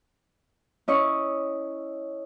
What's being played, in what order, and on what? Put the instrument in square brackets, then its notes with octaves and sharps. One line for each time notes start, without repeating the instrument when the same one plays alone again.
[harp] C#4 E4 D#5 C#6